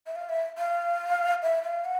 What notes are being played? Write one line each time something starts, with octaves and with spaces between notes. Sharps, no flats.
E5
F5
E5
F5
E5
F5
F#5